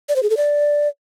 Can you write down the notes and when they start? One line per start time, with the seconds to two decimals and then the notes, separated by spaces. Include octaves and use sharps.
0.09 D5
0.16 C5
0.23 G#4
0.30 A4
0.37 D5